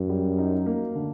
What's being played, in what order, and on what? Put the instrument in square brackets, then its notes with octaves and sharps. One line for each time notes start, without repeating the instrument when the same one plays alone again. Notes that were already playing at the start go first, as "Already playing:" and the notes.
Already playing: [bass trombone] F#2
[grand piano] G3
D#4
A#3
D3